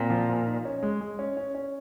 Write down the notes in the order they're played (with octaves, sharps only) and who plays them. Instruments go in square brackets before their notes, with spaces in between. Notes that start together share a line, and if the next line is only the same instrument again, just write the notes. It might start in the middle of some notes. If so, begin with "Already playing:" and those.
Already playing: [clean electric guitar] A#2 [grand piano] C4
[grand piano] F3
F3
D#4
C#4
G#3
G#3
C#4
C#4
C#4